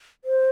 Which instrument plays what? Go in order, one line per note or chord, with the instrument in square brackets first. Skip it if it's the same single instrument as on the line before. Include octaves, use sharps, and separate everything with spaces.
[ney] C5